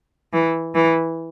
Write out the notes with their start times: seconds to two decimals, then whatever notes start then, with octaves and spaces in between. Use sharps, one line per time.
0.32 E3
0.74 E3